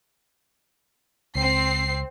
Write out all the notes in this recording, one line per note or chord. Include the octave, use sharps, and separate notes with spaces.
C#2 C4 C7